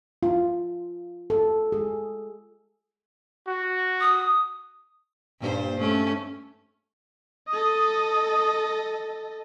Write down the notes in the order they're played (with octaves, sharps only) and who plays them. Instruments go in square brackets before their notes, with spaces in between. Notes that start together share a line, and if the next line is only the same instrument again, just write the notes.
[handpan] F4
A4
G#4
[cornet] F#4
[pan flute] D#6
[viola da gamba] G2 A#2 C5
A3 C#4
[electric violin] A4 D#5 [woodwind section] D#6